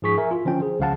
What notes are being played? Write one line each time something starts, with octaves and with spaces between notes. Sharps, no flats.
G#2 F3 G#4 C#6 B6
A#4 E5 G#5
F4
D3 F3 C#4 G5
G#4 C5
C#2 C#3 F3 F5 F#5 A5